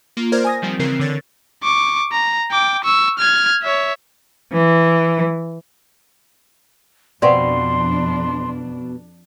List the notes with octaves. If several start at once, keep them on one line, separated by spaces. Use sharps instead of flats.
A#3 F4
A#4 C5 D5 F6 G#6
G#5 D#6 A#6
D#3 F3 G3 C4
C#3 E3 C4 A#4 C7
D3 C#5 A6
C#6 D6
A#5
G5 D6
C#6 E6
F6 G#6
C#5 E5
E3
F2 B2 C4 D4 D5 F5 F#5 C6